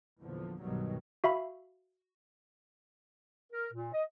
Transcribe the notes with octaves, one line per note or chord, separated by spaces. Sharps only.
E2 A#2 D3 F3
B1 G2 B2 D#3 F#3 G3
F#4 E5 F5 B5
A#4
A#2
D#5